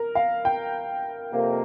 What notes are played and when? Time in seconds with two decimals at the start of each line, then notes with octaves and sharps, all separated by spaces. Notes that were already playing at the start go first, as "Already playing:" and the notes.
Already playing: A#4
0.15 F5
0.45 G5
1.32 F2 C3 A#3